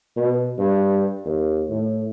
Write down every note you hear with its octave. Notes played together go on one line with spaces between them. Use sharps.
B2
G2
D#2
A2